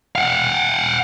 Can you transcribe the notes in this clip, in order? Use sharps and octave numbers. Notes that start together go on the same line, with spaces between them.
F5 F#5